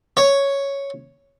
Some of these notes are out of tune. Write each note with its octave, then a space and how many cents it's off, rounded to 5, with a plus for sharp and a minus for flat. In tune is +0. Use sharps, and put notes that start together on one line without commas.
C#5 +0